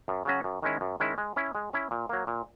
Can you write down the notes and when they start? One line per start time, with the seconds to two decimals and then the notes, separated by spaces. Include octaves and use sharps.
0.08 F#2
0.25 C#3 F#3 C#4 F#4
0.44 F#2
0.62 D#3 G#3 C#4 E4
0.81 F#2
1.00 D#3 G#3 C#4 E4
1.18 G#3
1.36 C#4 E4
1.55 G#3
1.73 C#4 E4
1.91 A#2
2.09 F#3 A#3
2.27 A#2